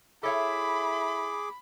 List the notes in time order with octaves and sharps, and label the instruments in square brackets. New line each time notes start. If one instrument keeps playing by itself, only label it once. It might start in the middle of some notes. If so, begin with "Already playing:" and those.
[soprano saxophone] E4 [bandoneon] G#4 D6 [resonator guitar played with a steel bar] A4 C#5 E5 [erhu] B5